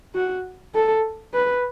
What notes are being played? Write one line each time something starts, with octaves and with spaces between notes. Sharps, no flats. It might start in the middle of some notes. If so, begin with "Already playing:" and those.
F#4
A4
B4